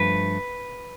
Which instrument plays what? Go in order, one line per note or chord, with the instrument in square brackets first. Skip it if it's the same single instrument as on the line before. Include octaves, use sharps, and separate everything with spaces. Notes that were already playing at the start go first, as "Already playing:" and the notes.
Already playing: [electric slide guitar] G2 F3 A3 B4